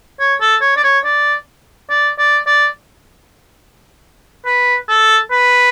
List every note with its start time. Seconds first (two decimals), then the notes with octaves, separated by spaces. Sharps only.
0.20 C#5
0.41 A4
0.61 C#5
0.77 D5
0.84 C#5
1.05 D5
1.90 D5
2.19 D5
2.47 D5
4.46 B4
4.89 A4
5.31 B4